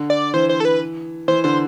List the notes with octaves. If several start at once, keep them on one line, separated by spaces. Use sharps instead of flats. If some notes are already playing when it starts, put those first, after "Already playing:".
Already playing: D3
D5
E3 C5
C5
A4
B4
E3 C5
D3 C5